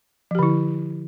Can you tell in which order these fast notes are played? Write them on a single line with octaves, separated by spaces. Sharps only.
F3 G4 D3 E4